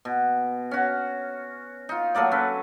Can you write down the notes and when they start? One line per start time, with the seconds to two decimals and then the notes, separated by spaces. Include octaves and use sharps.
0.05 B2
0.71 C#4 F#4
1.89 D#4 F4
2.15 F#3 A3 A#3 D5
2.31 C#4 A4 B4